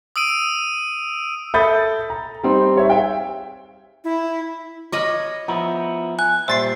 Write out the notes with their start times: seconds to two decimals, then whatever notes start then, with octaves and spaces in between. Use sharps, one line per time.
0.16 D#6 E6 D7 D#7
1.54 A4 E5 B5 D#6 G6 A6
2.10 A#5
2.43 G3 C4 D#4
2.76 G3 C#5 E5
2.90 G#4 E5 F5 G5
4.04 E4
4.92 C#5 D#5 B5 D6 F6
5.48 F3 B3 E4 A#5 D#6
6.19 G#5 F#6
6.48 A#2 G3 C5 D5 E5 C6 A6 C7